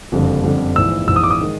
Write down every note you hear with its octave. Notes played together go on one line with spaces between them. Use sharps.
F#1 F2 D3 G3
F#1 F2 D3 G3
A#1 G#2 E3 E6
A#1 G#2 E3 E6
D#6
D6
D#6
D#3 G#3